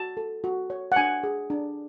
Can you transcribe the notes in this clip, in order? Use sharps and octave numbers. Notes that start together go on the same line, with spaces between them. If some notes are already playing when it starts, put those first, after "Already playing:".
Already playing: F#4 A5
A4
F#4
C#5
F#5
D4 G#5
G#4
D4